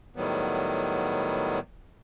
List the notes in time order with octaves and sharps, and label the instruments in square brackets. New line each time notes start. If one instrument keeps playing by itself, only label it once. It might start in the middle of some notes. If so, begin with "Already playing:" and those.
[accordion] A2 D#3 F#3 G3 B3